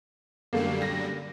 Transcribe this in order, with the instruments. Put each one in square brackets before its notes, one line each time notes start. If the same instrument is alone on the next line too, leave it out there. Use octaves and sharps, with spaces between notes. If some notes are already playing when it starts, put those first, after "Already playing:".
[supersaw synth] F#2 D3 G3 [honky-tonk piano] A3 A#3
[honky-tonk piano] A#6